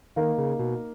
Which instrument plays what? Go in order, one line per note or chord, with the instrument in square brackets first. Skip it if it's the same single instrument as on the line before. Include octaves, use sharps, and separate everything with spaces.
[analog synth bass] D#3 [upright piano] A#3 D#4 A#4 F5
[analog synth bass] C#3
B2